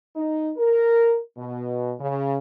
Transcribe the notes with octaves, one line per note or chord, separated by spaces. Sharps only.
D#4
A#4
B2
C#3